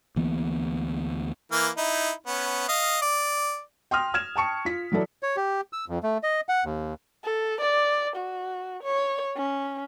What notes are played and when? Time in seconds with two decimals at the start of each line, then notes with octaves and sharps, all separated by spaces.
0.16 D2 E3 A#3 B3
1.52 E3 A#3 F6
1.77 D#4 E4
2.27 B3 C#4
2.68 D#5 F5
3.02 D5
3.91 G5 C6 D#6 F6 A#6
4.14 F6 G#6 E7
4.36 G5 A5 C#6 C#7
4.65 F4 B6
4.92 E3 F#3 E4 A4 D5
5.23 C#5
5.37 G4
5.73 E6
5.88 F2
6.03 A3
6.23 D#5
6.49 F#5
6.65 D#2
7.24 A4
7.60 D5
8.16 F#4
8.83 C#5
9.37 C#4